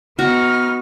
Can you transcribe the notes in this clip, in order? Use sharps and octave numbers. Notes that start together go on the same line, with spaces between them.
B3 D#4 F#4 F6